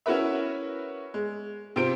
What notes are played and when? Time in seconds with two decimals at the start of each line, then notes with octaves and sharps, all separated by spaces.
0.06 C#4 E4 F#4 A#4 B4 E5
1.14 G#3
1.76 C3 C4 F4 C5 D7